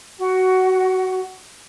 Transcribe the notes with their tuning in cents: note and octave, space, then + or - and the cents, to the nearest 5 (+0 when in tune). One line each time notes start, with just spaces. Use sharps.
F#4 +15